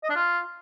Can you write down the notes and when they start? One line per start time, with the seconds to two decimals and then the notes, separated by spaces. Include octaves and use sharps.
0.03 D#5
0.10 D4
0.16 F4